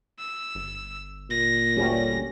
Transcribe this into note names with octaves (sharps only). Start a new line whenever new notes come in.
E6
G1
A#2 A#6
D2 G3 C#4